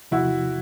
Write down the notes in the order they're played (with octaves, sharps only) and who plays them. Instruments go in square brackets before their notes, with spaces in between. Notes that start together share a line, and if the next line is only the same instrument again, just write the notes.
[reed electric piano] E2 C3 F3 A3 [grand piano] E4 F#4